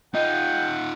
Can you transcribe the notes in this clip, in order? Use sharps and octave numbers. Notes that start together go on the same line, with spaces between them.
D#4 F4 D#5 F#5 G5